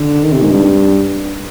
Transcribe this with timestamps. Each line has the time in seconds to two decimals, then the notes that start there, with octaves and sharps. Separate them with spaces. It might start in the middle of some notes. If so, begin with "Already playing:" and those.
Already playing: D3
0.24 D#3
0.32 C3
0.42 G#2
0.51 G2